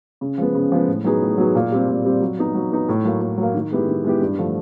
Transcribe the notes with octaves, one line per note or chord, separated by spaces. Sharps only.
C#3
F3 G#3 B3
C#3
F3 G#3 B3
A2
F#3 B3 D#4 G#4
A2
F#3 B3 D#4 G#4
A#2
G3 C4
A#2
G3 C4
F#3
B3 D#4
F#3
B3 D#4
A2
F#3 A#3
A2
F#3
A#3
D#3
G#3 B3 E4 G4
D#3
G#3 B3 E4 G4
G2
D3 F3 A3